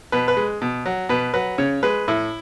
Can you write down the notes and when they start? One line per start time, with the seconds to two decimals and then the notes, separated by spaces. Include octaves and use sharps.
0.12 B2 B4
0.28 B4
0.37 G#3
0.62 B2
0.86 F#3
1.09 B2 B4
1.34 F#3 B4
1.58 C#3 C#5
1.83 G#3 B4
2.08 A2 E4